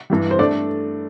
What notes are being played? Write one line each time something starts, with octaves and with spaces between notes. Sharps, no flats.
G2 E3 G3
C5
A3 D4 A4 D5